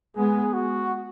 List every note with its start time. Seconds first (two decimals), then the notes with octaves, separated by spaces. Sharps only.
0.16 G#3 B3 G#4
0.54 F#4